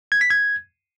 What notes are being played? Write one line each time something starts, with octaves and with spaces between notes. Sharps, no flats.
G#6
B6
G#6